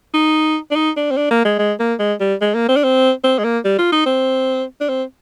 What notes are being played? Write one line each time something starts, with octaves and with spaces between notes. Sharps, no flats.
D#4
D4
D#4
D4
C4
D4
A#3
G#3
G#3
A#3
G#3
G3
G#3
A#3
C4
D4
C4
C4
G#3
A#3
G3
F4
D#4
C4
D4
C4